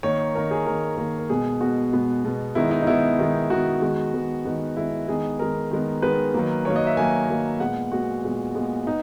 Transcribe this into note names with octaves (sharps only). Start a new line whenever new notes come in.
D#3 A#3 C#5
D#3 A#3 A#4
G#4
D#3 A#3 A#4
D#3 A#3 A#4
A#4
B2 G#3 B3 G#4
B2 G#3 B3 F#4
B2 G#3 B3
B2 G#3 B3
D#3 G#3 B3 E4
D#4
D#4
D#3 G#3 B3 E4
D#3 G#3 B3
D#3 G#3 B3 F#4
D#3 G#3 B3
D#3 G#3 B3
D#3 G#3 B3
D#3 G#3 B3 E4
D#3 G#3 B3 G#4
D#3 G#3 B3 A#4
D#3 G#3 B3
D#3 G#3 B3 B4
D#3 F#3 A#3
D#3 F#3 A#3 C#5
D#5
E5
D#3 F#3 A#3 G#5
D#3 F#3 A#3
A#2 G#3 B3 F#5
A#2 G#3 B3 F#4
A#2 G#3 B3
A#2 G#3 B3
B3 D#4